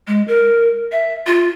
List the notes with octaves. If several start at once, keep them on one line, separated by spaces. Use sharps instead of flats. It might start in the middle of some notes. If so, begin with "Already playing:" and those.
G#3
A#4
E5
F4